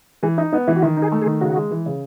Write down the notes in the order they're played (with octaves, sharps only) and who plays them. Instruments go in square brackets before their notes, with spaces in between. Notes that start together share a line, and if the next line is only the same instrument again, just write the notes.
[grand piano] E3 [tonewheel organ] G#4
[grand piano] D#4 [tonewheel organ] E4
[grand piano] B3 [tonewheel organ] D#4
[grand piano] E3 [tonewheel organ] E4
[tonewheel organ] F#4
[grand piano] D#3 [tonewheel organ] E4
[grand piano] D#4
[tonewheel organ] G#4
[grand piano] A3
[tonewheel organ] G#4
[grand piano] D#3
[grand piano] C#3 [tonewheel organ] F#4
[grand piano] G#3
E3
C#3